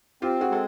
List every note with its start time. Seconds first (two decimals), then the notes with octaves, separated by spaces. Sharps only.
0.22 C4 F4 G4
0.41 F#4 G#4
0.50 G#3 A4